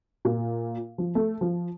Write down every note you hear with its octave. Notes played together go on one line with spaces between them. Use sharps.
A#2
F3
A3
F3